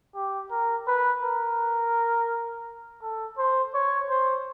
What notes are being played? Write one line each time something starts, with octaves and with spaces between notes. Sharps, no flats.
G4
A#4
B4
A#4
A4
C5
C#5
C5